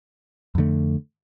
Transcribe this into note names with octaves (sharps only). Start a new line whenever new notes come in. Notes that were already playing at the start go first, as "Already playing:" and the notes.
F2 D3 A3